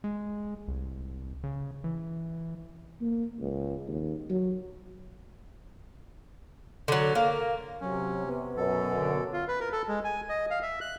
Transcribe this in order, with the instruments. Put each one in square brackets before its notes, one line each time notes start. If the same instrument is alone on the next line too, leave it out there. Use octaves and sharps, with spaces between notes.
[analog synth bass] G#3
C2
C#3
E3
[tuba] A#3
C#2
D#2
F#3
[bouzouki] D3 F#3
A#3
[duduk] C3 [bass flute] F#3 [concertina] C#4
[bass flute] B3
[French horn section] F#2 B2 [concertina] A4
[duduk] D3
[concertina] F4
B4
A#4
A4
G#3
G#5
D#5
F5
E5
F#6